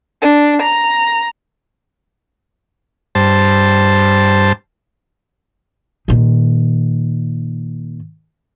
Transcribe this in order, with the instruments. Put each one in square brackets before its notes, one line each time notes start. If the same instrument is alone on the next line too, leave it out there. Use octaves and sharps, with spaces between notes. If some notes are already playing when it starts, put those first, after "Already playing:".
[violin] D4
A#5
[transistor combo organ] G2 C5 A5
[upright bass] A#2 D#3